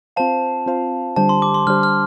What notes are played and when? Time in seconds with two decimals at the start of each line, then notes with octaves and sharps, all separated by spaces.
0.16 C4 F4 C5 F5 A5
0.66 C4 F4 C5 F5
1.16 D3 G3 D4 G4 C5 A5
1.29 C6
1.42 D6
1.54 C6
1.67 D3 G3 D4 G4 C5 F6
1.83 F6